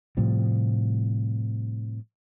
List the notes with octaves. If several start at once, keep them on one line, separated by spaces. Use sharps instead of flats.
A2 C3 F3 G3